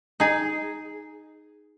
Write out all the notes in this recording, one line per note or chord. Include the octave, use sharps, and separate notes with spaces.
D#4 G#4